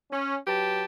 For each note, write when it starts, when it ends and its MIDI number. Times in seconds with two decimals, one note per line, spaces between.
0.11 0.36 61
0.47 0.84 54
0.47 0.84 67
0.47 0.84 71
0.47 0.84 81